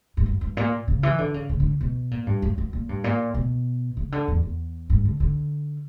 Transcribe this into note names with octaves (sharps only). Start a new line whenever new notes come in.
G2
F#2
G2
A#2
C#3
E3
D3
C#3
C#3
D3
B2
A#2
G2
F#2
F#2
A#2
G2
A#2
B2
C#3
D3
E2
E2
G2
D3
D3